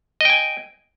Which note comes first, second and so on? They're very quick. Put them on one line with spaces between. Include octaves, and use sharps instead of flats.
D#5 G5 G#5